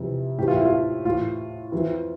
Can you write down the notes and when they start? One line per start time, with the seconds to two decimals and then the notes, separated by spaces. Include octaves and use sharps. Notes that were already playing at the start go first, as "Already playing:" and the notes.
Already playing: F2 C3 E3
0.38 A2 E3 G4
0.48 F4
0.56 E4
0.65 F4
1.05 A2 E3 F4
1.72 F2 E3